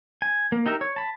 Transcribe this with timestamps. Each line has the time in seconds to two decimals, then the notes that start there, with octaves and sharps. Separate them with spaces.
0.22 G#5
0.52 A#3
0.66 D#4 G4 A#4 E5
0.81 C#5
0.96 A5 B5